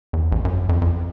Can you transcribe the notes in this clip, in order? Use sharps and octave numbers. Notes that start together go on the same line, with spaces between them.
E2
A1
F#2
F2
F2